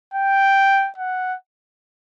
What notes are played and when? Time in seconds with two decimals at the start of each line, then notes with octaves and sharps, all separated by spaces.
0.14 G5
0.98 F#5